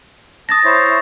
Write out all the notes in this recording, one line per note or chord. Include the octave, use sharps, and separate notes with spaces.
A5 D#6 A6 A#6
E4 C5 C#5